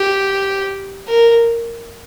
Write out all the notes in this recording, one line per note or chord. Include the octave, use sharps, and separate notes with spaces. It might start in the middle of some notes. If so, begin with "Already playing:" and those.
Already playing: G4
A#4